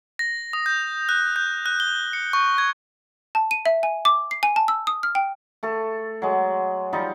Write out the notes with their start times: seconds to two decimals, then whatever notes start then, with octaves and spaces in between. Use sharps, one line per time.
0.19 A#6
0.53 D#6
0.66 G6
1.09 F#6
1.36 G6
1.66 F#6
1.80 G7
2.13 C#7
2.33 C#6
2.58 G#6
3.35 A5
3.51 D#7
3.66 E5
3.83 G#5
4.05 D6
4.31 C7
4.43 G#5
4.56 A5
4.68 E6
4.87 D#6
5.03 F6
5.15 G5
5.63 A3 A4
6.22 F#3 G#3
6.93 F3 G3 D#4